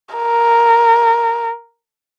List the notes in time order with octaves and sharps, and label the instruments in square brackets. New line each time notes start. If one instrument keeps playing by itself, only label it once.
[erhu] A#4